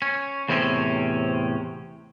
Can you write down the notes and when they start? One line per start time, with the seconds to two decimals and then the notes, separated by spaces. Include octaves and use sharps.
0.02 C#4
0.49 E2 A2 C3 C4 C#4